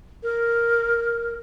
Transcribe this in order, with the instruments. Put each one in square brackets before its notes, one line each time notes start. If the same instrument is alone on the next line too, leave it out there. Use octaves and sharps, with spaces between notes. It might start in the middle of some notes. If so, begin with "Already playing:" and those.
[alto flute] A#4